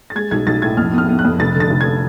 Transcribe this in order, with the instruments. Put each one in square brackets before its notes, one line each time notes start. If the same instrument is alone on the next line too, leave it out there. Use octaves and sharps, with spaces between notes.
[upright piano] A6
G#3 G#6
B1 G#6
B1 A6
A2 G#6
F2 F6
B3 F6
B3
F#6
F2
F1 A6
D3
A6
F1
G#6